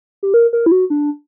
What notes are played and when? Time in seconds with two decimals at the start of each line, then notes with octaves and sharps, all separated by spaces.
0.23 G4
0.34 A#4
0.53 A#4
0.66 E4
0.72 F#4
0.90 D4